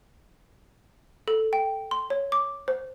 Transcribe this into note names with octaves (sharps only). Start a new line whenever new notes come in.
A4
G5
C6
C#5
D6
C5